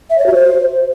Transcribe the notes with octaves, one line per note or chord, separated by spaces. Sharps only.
E5
C#5
F#4
C5